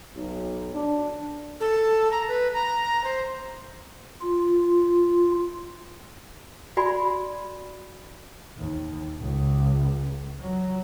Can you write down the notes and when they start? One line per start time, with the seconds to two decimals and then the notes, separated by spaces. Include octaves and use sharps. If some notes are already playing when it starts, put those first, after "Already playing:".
0.16 B1
0.74 D4
1.60 A4
2.11 A#5
2.28 B4
2.54 A#5
3.04 C5
4.22 F4
6.77 F#4 D5 G#5 B5 C6
8.58 D#2
9.20 C#2
10.40 F#3